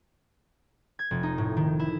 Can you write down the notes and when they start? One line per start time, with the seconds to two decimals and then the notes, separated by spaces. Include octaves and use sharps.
0.99 G#6
1.11 F1
1.23 D#4
1.38 A2
1.57 D#3
1.79 E4